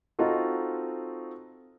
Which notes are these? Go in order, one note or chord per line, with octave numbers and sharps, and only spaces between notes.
C4 D#4 F4 F#4 A4